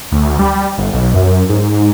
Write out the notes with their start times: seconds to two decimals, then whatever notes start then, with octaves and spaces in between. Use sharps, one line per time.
0.12 D2
0.39 G3
0.78 G1
0.93 B1
1.14 F#2
1.49 G#2